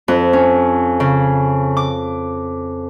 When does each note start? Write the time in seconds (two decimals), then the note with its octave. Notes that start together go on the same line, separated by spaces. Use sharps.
0.08 F2
0.33 C#4
1.00 C#3
1.77 D6